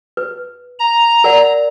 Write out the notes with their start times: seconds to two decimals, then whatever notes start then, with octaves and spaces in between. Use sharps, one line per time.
0.17 B4
0.79 A#5
1.24 A#4 D5 F#5